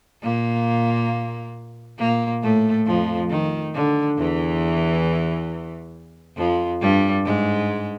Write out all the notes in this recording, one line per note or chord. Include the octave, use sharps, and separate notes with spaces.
A#2 A#3
A#2 A#3
A2 A3
F2 F3
D#3
D3
E2 E3
F2 F3
G2 G3
G#2 G#3